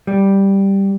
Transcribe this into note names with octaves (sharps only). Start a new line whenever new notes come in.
G3